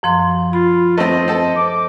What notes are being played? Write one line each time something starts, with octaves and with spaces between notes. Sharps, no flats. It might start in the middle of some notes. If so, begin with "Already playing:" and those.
F#2 F3 C6
F4 B5
A3 C4 D#5
C4 A4
D6